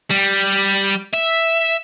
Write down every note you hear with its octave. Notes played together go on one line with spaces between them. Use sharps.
G3
E5